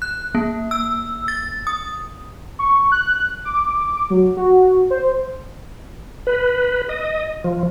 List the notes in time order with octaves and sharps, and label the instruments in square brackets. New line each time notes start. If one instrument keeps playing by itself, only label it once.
[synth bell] F#6
A#3
E6
A6
D#6
[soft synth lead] C#6
F#6
D6
F#3
F#4
C5
[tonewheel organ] B4
D#5
F3